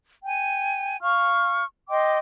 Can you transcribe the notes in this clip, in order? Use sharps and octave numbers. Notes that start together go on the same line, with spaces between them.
G5 G#5
F5 C#6 F6
D#5 G5 C6 D6